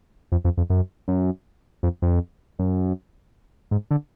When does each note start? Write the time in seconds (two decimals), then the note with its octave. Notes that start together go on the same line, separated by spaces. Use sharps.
0.32 F2
0.45 F2
0.57 F2
0.70 F#2
1.08 F#2
1.83 F2
2.02 F2
2.59 F#2
3.71 G#2
3.91 D3